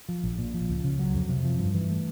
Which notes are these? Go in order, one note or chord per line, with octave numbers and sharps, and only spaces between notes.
F3
A#1
A#2
F3
C#2
C#3
F#3
F2
C3
F3
G2
E3
A3